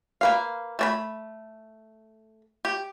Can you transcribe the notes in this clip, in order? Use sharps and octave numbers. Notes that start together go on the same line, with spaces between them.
A#3 B4 F5
A3 D5 B5
G4